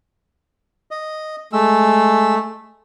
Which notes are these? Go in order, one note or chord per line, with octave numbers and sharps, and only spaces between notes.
D#5
G#3 A3 E6